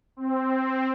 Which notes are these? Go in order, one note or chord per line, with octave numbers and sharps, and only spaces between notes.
C4